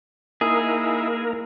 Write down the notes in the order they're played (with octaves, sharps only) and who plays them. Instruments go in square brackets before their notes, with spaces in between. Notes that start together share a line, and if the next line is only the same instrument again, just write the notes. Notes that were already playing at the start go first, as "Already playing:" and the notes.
[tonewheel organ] A#3 A#4 [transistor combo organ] D#4 E4 [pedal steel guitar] G#4